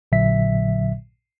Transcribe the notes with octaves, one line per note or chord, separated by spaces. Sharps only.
A#1 A#2 D3 F#3 E5 B6